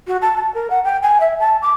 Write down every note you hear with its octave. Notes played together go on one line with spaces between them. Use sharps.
F#4
A5
A5
A#4
F#5
G5
G#5
E5
A5
D6